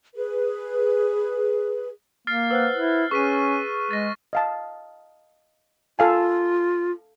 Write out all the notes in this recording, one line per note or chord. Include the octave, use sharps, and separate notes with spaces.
G#4 B4
A#3 F6 A6 C7
B4 C5 F#5 E6 F#6
E4
C#4 G#4 B4 C#6 F6 B6 D#7
G#3 A6 A#6
D#5 F5 A5
F4 A4 F5 G#5